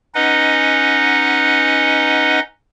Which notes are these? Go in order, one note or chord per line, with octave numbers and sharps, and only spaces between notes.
C#4 D#4 B4 D#5 F#5